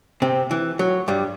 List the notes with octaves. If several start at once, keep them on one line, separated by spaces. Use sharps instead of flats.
C3 C4
E3
F#3
G2 G3